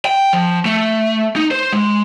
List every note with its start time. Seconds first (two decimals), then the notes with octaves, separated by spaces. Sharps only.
0.05 G5
0.33 F3
0.65 A3
1.36 D#4
1.51 C5
1.72 G#3